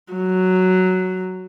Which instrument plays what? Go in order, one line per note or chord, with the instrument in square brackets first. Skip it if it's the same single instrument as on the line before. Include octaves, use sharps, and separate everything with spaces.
[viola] F#3